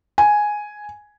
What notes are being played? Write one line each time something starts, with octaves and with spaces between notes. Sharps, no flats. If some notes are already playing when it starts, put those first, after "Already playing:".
G#5